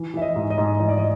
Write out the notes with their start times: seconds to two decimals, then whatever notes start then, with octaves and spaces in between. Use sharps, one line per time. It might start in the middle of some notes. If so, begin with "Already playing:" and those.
Already playing: E3
0.14 E3 E5
0.22 D#5
0.36 G#2
0.50 D#5
0.58 G#2
0.80 E3 D#5
0.89 D5
0.97 D#5